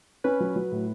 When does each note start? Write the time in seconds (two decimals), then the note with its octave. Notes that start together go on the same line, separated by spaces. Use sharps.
0.24 C#4 B4
0.40 F#3
0.56 F#3
0.72 A2